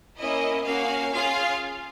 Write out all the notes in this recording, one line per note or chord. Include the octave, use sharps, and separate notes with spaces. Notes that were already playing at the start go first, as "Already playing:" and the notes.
A#3 C#4 E4 D#5
A#3 C#4 F#4 F5
C#4 F4 G#4 F5